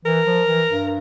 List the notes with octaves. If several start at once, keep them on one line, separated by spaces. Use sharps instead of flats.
E3 A#4
F3
E3
G2